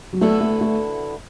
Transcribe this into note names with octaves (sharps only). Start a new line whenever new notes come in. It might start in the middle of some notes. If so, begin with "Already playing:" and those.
F#3
D2 D3 A3 B3 E4 A4
A3
A3